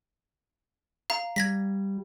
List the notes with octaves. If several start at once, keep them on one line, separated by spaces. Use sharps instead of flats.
F5 A#5
G3 G#6 A#6 B6